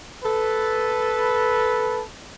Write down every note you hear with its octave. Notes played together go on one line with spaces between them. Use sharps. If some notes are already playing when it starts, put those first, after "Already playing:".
A4 B4